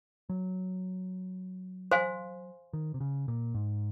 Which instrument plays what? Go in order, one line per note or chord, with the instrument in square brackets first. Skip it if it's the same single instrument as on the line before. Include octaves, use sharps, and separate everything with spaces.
[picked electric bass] F#3
[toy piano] C5 F5 G#5 C6
[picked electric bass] D#3
C3
C#3
A#2
G#2